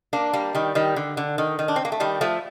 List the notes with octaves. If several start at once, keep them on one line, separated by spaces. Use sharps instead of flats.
A#3 D4
G3 A#3
D#3 G3
D#3 G3
D3
D3
D#3
D#3
D4
C4
A#3
A3
D#3 G3
F3 A3